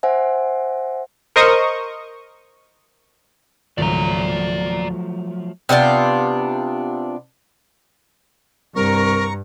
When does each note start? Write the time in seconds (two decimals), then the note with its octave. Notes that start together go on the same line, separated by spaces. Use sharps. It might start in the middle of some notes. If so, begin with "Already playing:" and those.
0.03 C5 E5 F#5 G#5
1.36 A#4 C5 D#5 C#6 D#6
3.78 C#2 G#2 D#3 F3 F#3 A3 D5 A#5
5.69 C3 B3 D4 F4
8.76 C2 G2 A#4 A#5 C#6